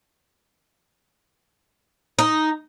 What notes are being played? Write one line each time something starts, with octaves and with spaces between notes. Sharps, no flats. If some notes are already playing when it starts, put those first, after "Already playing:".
D#4